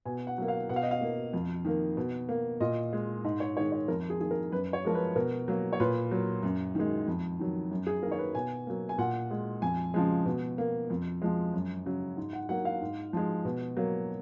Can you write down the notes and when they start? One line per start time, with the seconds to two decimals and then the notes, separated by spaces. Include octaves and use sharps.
0.06 B2 G#5
0.27 F#5
0.38 F#3 A#3
0.48 F5
0.69 B2 F#5
0.76 F5
0.83 D#5
0.91 F5
1.01 A#3
1.33 F2
1.65 D#3 A#3
1.97 B2
2.29 A#3
2.61 A#2 D#5
2.93 G#3
3.24 G#2 D#5
3.40 C#5
3.57 G#3 C#5
3.60 D#3
3.72 C#5
3.88 F2 A#4
4.10 G#4
4.20 D#3 A#3 G#4
4.31 A#4
4.52 F#2 B4
4.73 C#5
4.84 F3 G#3 A#4
4.95 B4
5.16 B2 A#4
5.48 F#3 A#3
5.73 C#5
5.80 A#2 B4
6.11 F#3 A#3
6.43 F#2
6.75 D#3 G#3
7.07 F2
7.39 D#3 F#3
7.71 F#2
7.87 G#4
8.02 A#3 A#4
8.07 D#3 C#5
8.18 B4
8.35 B2 G#5
8.67 F#3 A#3
8.89 G#5
8.98 A#2 F#5
9.31 G#3
9.62 F2 G#5
9.94 C#3 F3 G#3
10.26 B2
10.58 A#3
10.90 F2
11.22 F3 G#3
11.53 F#2
11.86 C#3 F#3
12.17 G#2
12.33 F#5
12.49 F#3 A#3 F#5
12.65 F5
12.81 G#2
13.13 F3 G#3
13.45 B2
13.77 F#3 A#3